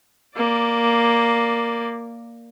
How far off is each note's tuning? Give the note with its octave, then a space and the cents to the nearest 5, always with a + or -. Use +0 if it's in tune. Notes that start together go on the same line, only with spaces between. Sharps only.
A#3 +0 D5 +0